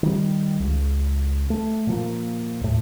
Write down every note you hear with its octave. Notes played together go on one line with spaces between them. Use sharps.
D#3 G3
C#2
A3
A#2 F3 A#3
D#2 A2